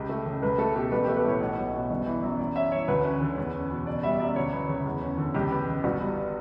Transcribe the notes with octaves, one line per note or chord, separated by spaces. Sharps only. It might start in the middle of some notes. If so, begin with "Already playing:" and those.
Already playing: C#2 G4
A3
C#3
C#2 B4
A3 A4
B2 G4
A1 B4
G4
A3
B4
A2 C#5
B1
B1
B2
G1
E3
F#2
F#2 D5
C#4 E5
E3 C#5
D2 B4
C#4
D3
E2
C#4
B2
F#1 D5
G3 E5
F#2 D5
D2 C#5
B3
C#3
E2
C#4
D3
C#2 G4
B3
C#3
G1 F#4
G3